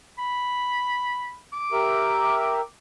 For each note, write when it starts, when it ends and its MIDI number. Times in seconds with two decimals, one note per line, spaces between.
0.19 1.37 83
1.53 2.67 86
1.72 2.61 67
1.72 2.61 70
1.72 2.61 76